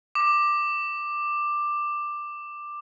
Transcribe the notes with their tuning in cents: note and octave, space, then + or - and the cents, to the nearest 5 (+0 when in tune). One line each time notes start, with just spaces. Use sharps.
D6 +10